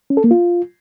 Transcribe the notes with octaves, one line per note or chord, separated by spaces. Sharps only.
C#4
A4
A#3
F4